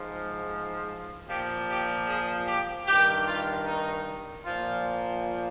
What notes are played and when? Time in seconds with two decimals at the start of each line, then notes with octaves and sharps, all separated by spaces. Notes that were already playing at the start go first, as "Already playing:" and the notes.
Already playing: G#2 F3
1.28 A#2 F3 G4
1.68 G4
2.08 G#4
2.47 G4
2.87 G2 D#3 G4
3.26 F4
3.66 D#4
4.45 A#2 F3 F4